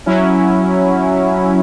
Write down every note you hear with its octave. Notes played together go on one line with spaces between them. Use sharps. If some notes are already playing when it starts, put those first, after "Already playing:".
F#3 C#4 E4